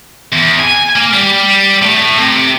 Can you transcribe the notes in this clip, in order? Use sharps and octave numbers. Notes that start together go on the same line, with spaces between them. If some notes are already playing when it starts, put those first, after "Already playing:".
E2
G#5
A#3
G3
A2
C3